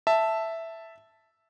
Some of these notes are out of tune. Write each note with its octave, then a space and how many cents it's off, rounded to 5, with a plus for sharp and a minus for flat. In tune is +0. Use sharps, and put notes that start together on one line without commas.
E5 +0 A5 +0